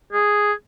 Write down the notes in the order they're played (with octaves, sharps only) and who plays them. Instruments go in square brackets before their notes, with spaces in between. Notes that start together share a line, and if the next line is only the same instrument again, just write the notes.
[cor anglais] G#4